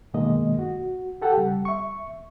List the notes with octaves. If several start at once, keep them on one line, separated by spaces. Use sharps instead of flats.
F#2 B2 D#3 G#3 A#3 D#5
F#4
G4 A4 F#5 G5 A5
C#3 G3
E5 C#6